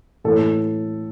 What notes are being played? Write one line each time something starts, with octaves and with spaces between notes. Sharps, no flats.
A2 E3 A4